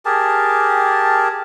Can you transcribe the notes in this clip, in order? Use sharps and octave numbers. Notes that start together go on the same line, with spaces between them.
G4 G#4 A#4 A5